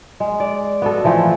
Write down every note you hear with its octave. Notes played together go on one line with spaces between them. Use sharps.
G#3
D5
B3 F#4 A4
E3 F3 A3 C4